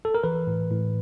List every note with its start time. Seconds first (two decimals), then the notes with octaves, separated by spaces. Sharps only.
0.05 A4
0.15 A#4
0.23 E3 B4
0.47 A2
0.71 A2